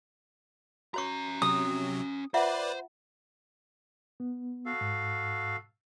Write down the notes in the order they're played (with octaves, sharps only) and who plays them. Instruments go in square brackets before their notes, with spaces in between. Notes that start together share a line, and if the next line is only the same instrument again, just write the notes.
[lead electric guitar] C#4 A#5 [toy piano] F#4 C#5 C#6
[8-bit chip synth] C3 F#3 [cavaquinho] D#6
[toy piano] F4 E5 F#5 [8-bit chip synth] B4 D5 [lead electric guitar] C5
[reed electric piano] B3
[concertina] F#4 A4 F5
[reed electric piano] G#2